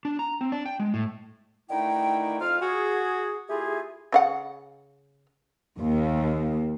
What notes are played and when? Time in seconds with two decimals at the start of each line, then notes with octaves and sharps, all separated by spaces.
0.05 D4
0.19 A#5
0.41 C4
0.52 D4
0.66 G5
0.80 G#3
0.94 A2
1.70 D3 D#3 A3 D#4 E4 G5
2.41 F2 F4 F5 F6
2.61 F#4 G#4
3.50 A3 E4 F4 G4 G#4
4.12 C#3 F5 F#5
5.80 D#2